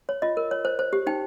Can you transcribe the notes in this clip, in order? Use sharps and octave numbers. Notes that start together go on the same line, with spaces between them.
C#5
F4 D#5
A#4
C#5
C5
C5
G4
D#4 G5